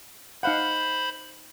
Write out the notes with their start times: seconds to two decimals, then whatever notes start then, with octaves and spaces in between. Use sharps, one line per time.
0.43 D#4 C5 F5 F#5 B5